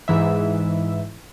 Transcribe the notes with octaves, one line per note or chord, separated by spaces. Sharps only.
G#2 E3 E5